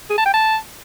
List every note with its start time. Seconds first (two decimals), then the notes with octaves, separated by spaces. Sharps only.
0.10 G#4
0.18 A5
0.26 G5
0.34 A5